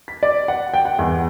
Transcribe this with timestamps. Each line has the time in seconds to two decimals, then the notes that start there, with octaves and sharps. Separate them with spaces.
0.08 B6
0.23 D5
0.48 F#5
0.74 G5
0.85 F#5
0.99 E2